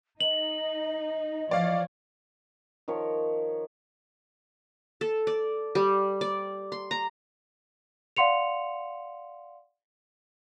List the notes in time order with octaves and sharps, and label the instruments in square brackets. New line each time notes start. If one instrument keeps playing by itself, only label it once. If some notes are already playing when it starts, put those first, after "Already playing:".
[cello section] D#4 [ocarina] D#5 [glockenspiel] F#7
[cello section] E3 F3 C#5 [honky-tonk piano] D5 F5
[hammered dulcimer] D#3 F3 A#4 C#5
[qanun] A4
D5
G3
D5
C6
A#5
[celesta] D5 F5 F#5 C6 C#7 F7